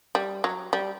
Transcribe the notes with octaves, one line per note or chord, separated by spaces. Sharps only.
G3
F#3
G3